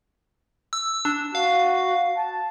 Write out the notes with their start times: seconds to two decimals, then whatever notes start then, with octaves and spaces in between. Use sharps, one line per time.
0.73 E6
1.05 D4
1.35 F#4 F5
2.17 A5